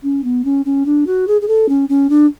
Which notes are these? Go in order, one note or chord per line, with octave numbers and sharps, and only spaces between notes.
C#4
B3
C#4
C#4
D4
F#4
G#4
G#4
A4
C#4
C#4
D4